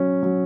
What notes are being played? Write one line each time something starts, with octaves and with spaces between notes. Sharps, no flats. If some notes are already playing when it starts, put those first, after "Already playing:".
Already playing: F#3 C#4
F#3